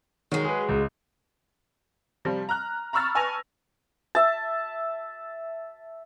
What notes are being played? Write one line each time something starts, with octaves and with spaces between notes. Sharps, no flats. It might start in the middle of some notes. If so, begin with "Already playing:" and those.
D#3 F#3 G#3
G#4 B4
C#2
C3 F3 G3
A#5 F6 F#6
A#5 B5 C#6 E6 F6 A6
B4 G#5 A5 C#6 A#6 F7
E5 A5